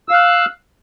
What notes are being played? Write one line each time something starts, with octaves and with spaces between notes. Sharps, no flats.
F5 E6 F#6